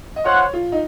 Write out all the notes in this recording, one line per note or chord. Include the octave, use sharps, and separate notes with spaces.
D#5
F4 C5 C#5 F#5
F4
D#4